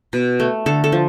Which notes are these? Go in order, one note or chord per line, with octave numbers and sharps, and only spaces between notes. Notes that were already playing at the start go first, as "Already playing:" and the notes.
B2
A3
D3 A4
A4
F3